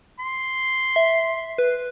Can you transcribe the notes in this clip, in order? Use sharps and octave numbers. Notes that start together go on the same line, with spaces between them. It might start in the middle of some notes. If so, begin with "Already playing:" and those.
C6
E5
B4